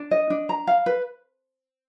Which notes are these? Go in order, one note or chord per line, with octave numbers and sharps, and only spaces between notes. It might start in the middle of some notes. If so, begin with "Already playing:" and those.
Already playing: D4
D#5
D4
A#5
F5
B4